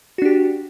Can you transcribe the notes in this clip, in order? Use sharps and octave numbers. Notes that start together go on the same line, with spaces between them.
D4 F#4 G4